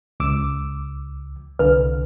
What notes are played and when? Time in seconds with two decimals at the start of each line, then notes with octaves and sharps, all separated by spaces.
0.20 C#2 D6 E6
1.59 C2 D3 B4